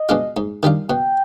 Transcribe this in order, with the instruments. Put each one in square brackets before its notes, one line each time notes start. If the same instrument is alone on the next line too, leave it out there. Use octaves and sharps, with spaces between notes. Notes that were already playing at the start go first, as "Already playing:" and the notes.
Already playing: [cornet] D#5
[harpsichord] B2 G#3 D4 F4
G#2
D#3 G3 D4 F4
[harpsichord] B2 [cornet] G5